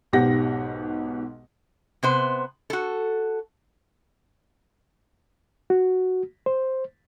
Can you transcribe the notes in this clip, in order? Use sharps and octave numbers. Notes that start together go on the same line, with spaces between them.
B1 G#2 B2 G4 F#5 A#6
C3 B3 C5
F#4 A4
F#4
C5